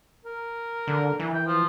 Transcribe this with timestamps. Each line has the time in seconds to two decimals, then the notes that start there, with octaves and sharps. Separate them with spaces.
0.25 A#4
0.87 D3
1.20 E3
1.34 G5
1.47 F3